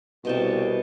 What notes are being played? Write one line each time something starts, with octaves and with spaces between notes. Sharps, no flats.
C2 B2 G5 A5